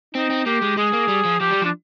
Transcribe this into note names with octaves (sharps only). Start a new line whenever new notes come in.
C4 D#4
C4
A#3 G4
G#3
G#3 G#4
A#3
G3
F3
F3 G4
G3
F3
D4